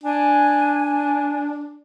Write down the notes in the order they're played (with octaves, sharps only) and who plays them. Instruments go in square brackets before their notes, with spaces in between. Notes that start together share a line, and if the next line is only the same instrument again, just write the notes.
[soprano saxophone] D4 [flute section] G#5